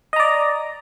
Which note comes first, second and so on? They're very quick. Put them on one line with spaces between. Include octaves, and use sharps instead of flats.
D#5 A#5 D5